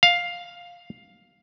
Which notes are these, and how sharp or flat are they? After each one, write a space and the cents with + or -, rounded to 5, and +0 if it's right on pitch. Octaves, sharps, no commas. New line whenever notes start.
F5 +5